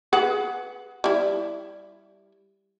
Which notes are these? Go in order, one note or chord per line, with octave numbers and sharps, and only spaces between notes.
G#4 B4 F#5
G3 E4